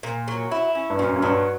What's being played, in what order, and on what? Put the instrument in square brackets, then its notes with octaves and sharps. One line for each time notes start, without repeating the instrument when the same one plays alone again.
[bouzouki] A#2
F#3
E4
C#4
[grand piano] G2
[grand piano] F#2 [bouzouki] A#2
[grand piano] F#2
[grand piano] G2 [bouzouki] F#3